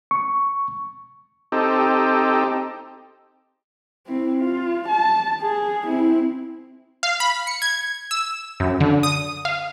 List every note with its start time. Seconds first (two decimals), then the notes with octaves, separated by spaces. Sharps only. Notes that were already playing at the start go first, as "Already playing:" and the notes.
0.11 C#6
1.52 C4 D#4 G4 A4
4.07 C4 E4
4.40 F4
4.88 A5
5.41 G#4
5.84 C4 E4
7.03 F5
7.20 B5
7.47 C#7
7.62 G#6
8.11 E6
8.60 F#2
8.80 D3
9.03 D#6
9.45 F5